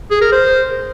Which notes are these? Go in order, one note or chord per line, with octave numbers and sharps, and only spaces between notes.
G#4
A#4
C5